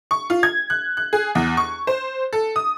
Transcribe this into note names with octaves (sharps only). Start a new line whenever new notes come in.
C#6
F4
G#6
F#6
F#6
G#4
E2
C#6
C5
A4
D#6